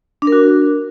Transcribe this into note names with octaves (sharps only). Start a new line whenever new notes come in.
D4
A#4
F#4